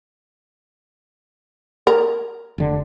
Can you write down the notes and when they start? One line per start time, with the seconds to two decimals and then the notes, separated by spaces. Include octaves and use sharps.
1.87 A#4
2.58 F1 D3